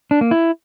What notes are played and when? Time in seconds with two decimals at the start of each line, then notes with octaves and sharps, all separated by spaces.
0.11 D4
0.21 A#3
0.31 E4